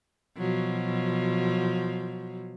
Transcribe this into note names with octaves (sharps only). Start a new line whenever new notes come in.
B2 F3 F#3